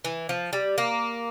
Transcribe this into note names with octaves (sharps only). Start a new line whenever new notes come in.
E3
F3
G3
A#3